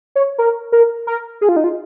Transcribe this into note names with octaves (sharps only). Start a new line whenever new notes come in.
C#5
A#4
A#4
A#4
G#4
F4
D#4
F4